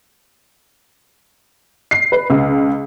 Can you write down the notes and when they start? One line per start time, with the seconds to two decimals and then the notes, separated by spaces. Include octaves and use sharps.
1.91 C7
2.12 B4
2.30 C#2